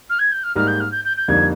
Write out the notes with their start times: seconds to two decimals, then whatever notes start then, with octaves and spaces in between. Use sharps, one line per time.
0.10 F6
0.19 G#6
0.32 G6
0.43 F6
0.56 G#2 G3 A#3 D#4 F6
0.67 G6
0.80 F6
0.91 G6
1.05 G6
1.17 G6
1.28 F2 D3 G3 A#3 D#4 G#6